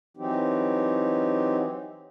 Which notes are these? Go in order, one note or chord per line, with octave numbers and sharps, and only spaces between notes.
E3 F#3 C4 D#4 G4